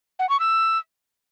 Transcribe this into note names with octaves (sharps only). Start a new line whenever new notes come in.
F#5
C#6
E6